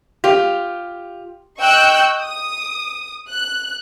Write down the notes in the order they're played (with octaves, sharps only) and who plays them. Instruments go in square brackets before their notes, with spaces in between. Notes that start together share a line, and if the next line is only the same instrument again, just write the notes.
[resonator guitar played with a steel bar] F4 [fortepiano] G4
[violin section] D#5 G5 C#6 E6 F#6 G6
D#6
F#6